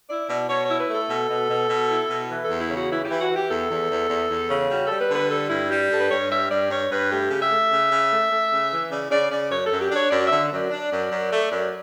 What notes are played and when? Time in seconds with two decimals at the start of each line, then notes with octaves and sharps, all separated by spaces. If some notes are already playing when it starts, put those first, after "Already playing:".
0.09 E4 D5
0.29 B2 D5
0.49 B2 C#5
0.65 E4 C#5
0.80 B4
0.90 A3 A4
1.10 B2
1.29 B2
1.50 B2
1.70 B2
1.90 E4
2.10 B2
2.30 E3 B4
2.44 A4
2.49 E2
2.60 E4
2.70 C#3
2.75 F#4
2.90 E3 E4
3.05 G4
3.10 E3
3.20 F#4
3.30 E3
3.35 G4
3.51 E2 A4
3.71 E2
3.90 E2
4.10 E2
4.30 E2
4.50 C#3
4.70 G3 F#4
4.86 A4
4.91 G3
5.00 B4
5.11 D3 B4
5.30 G3 A4
5.50 G2 E4
5.71 G3 G4
5.90 G2 A4
6.01 B4
6.11 G2 C#5
6.31 G3 E5
6.51 G2 D5
6.70 G2 C#5
6.91 G2 B4
7.11 A3 G4
7.30 C#3
7.41 E5
7.51 A3
7.71 C#3
7.91 C#3
8.12 A3
8.31 A3
8.51 C#3
8.72 E3
8.91 C#3 D5
9.11 C#3 D5
9.31 C#3 D5
9.51 F#2 C#5
9.66 A4
9.72 F#2
9.81 G4
9.91 D4 C#5
10.11 F#2 D5
10.27 E5
10.32 D3
10.52 F#2 D5
10.71 D4
10.92 F#2
11.12 F#2
11.32 A3
11.52 F#2